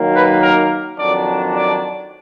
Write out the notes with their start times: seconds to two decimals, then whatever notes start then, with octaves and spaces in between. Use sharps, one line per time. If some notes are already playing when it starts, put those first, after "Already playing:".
Already playing: D#3 F#3 A#3
0.14 B4
0.41 A#4
0.98 F2 D#3 F#3 D4 D5
1.55 D5